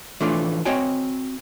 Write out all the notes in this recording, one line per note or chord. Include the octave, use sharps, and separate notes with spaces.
E3 F3 A3 C#4 D4 F4
C4 F#4 C#5 D#5 G5 G#5